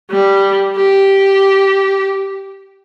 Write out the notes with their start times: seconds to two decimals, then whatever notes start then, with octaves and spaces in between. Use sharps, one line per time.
0.11 G3
0.77 G4